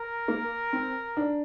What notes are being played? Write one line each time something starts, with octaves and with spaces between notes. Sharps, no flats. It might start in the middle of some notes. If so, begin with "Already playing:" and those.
Already playing: A#4
A#3
C4
D4